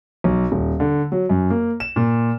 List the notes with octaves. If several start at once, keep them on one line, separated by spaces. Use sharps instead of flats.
B1
D#1
D3
F#3
F#2
A#3
E7
A#2